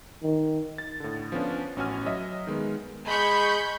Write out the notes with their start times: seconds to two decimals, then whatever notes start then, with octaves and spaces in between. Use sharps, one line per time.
0.23 D#3
0.78 A6
1.00 A2 D3
1.32 F3 B3 C#4 D4
1.77 A1 C#4 F#4 G#5 F6
2.06 F#3 D#5 E5
2.47 D#3 G#3 B3
3.06 G#3 B5 C#6 G6